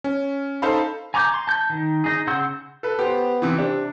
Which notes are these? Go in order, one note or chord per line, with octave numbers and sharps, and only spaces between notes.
C#4
D#4 A4 C5 F5 A5 B5
G#5 A#5 C#6 D6 G6
C6
A5 G6
D#3
D#4 G#4
C#3 F#5 C6 E6 G6
A4 B4
B3 G4 C5
C3 E3
C3 D4